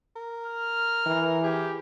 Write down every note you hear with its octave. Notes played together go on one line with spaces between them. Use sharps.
A#4
F6
E3
G4 G#4